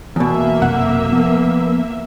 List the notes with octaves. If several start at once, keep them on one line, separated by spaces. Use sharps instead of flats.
E2 B2 A#3 E5
B1 F#2 C3 F#5
F3 B3